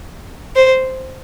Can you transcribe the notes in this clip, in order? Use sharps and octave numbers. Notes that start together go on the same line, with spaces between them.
C5